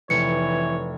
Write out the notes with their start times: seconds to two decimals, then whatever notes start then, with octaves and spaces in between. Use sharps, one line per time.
0.10 F1 E3 C#5 C#7